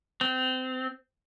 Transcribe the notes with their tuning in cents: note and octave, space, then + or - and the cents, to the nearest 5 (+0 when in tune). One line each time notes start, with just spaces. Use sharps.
C4 -25